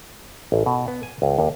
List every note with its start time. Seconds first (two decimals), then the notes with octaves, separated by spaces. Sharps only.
0.52 A1
0.66 B2
0.88 B3
1.03 G#5
1.22 C#2
1.39 D#2